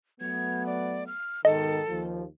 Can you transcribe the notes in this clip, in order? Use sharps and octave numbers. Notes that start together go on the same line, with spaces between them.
F#3 A3 B3 G#6
D5
F6
G#2 B2 D#3 A4 D#5
D#2 F3